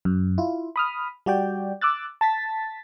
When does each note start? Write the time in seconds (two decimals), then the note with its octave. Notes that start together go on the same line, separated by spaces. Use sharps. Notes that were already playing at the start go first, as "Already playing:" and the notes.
0.05 F#2
0.38 E4 F4
0.76 B5 D#6 F6
1.26 G3 F#4 D5 G5
1.81 D6 E6 F#6 A6
2.21 A5 A6 B6